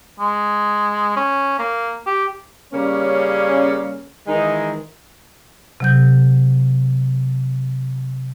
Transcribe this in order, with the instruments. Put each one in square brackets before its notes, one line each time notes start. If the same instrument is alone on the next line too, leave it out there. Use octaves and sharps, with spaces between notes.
[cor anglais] G#3
C#4
A#3
G4
[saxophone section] C#3 G3 A#3 C#4
D#3 E3 G#3 D#4
[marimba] C3 F#3 G6